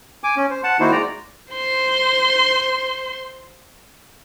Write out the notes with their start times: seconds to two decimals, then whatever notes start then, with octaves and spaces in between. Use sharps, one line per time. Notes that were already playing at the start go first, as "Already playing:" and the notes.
0.24 G#5 D6
0.37 C#4
0.50 C5
0.64 F#5 A5
0.80 D#3 A#3 D#4 E4 F#4 C5
0.92 G#3 D5 A#5
1.53 C5 C6